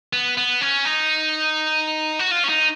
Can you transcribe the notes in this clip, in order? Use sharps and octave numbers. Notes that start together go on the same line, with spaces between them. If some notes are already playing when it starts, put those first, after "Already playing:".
B3
B3
C#4
D#4
F#4
F4
C#4
D#4